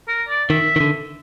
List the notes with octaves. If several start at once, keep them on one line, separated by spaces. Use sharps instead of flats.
A#4
D5
D#3 E5
D#3
D3